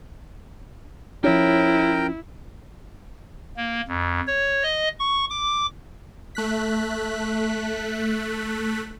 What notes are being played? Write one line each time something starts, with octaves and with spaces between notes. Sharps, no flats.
F3 C#4 E4 A#4 G5
A#3
F2
C#5
D#5
C#6
D6
A3 F#6 B6